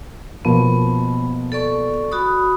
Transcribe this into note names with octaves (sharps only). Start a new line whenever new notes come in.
B2 F3 A#3 B3
A4 D5 C#6
F#4 B5 D#6